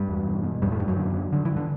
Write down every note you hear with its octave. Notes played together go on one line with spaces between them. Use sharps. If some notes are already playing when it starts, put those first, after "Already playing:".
Already playing: G2 G3
E2
B2
B2
E2 G2 G3
A2 A3
E2 G2 G3
F#2 F#3
D3
D3
G2 D3
E3
G2
D3